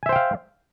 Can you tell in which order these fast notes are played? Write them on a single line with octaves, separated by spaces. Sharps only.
G#5 E5 C5 G5 F5